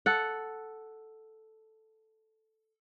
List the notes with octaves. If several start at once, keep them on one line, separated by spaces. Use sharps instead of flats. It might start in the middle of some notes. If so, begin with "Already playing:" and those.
A4 F#5